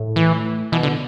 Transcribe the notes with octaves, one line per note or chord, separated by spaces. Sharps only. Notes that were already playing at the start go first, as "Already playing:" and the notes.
Already playing: A2
E3
B2 E3
D3